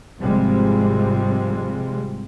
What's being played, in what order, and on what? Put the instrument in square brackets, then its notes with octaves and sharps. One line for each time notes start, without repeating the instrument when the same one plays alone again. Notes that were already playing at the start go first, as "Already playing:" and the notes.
[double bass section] G#1 C3 F3 G3 G#3 C4